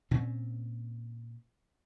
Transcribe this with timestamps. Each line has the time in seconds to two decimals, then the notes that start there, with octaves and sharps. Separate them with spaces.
0.11 A#2 C4 C#4